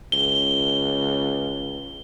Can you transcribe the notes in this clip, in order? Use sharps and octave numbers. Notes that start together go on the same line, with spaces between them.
C#2 G7